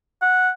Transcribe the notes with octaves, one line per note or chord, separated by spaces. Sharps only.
F#5